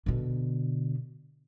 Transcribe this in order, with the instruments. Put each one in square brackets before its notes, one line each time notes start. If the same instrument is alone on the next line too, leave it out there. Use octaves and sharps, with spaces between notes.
[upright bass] B2 D3